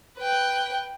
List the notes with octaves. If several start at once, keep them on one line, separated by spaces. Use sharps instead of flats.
B4 G5